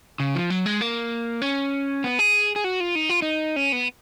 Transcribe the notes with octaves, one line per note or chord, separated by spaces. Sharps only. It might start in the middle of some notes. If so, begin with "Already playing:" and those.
C#3
F3
F#3
G#3
A#3
C#4
B3
G#4
G#4
F#4
F4
D#4
F4
D#4
C#4
B3